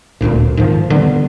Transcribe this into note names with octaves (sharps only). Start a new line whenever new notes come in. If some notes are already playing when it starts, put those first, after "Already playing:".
D1 G1 D2 A#2
G#2 D#3 F3
D3 G3 B3